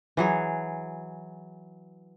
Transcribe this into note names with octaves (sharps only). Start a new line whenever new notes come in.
E3 F#3 G#4